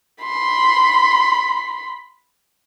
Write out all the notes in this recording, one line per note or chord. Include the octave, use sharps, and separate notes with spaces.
B5 C6